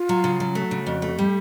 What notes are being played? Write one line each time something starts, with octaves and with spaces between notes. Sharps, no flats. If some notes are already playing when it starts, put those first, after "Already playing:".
Already playing: F4
F#3
C#3
F#3
A3 F#4
C#3
F2
A3
G3 G4